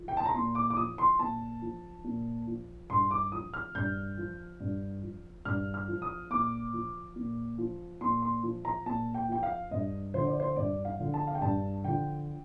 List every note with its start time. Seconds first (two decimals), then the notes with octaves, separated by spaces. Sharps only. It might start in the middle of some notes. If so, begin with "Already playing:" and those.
Already playing: F3
0.08 G5
0.17 A5
0.25 A#5
0.34 A#2 C6
0.55 D6
0.70 D6
0.76 F3 D#6
0.98 C6
1.19 A#2 A5
1.62 F3
2.04 A#2
2.47 F3
2.90 G2 C6
3.11 D6
3.32 F3 D#6
3.54 F6
3.75 G2 G6
4.18 F3
4.60 G2
5.03 F3
5.45 G2 F6
5.74 F6
5.88 F3
6.02 D#6
6.30 A#2 D6
6.73 F3
7.16 A#2
7.58 F3
8.01 A#2 C6
8.22 C6
8.43 F3
8.65 A#5
8.86 A#2 A5
9.14 G5
9.28 F3 G5
9.43 F5
9.71 G2 D#5
10.14 D3 F3 C5
10.27 D5
10.40 C5
10.56 G2 D5
10.85 F5
10.99 D3 F3
11.14 A5
11.27 F5
11.34 G5
11.41 G2 A5
11.84 D3 F3 G5